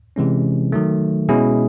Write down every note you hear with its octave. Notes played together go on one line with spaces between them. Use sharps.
C3 E3 G#3 C#4
D#3 F#3 A3
B2 G#3 C#4 E4 G#4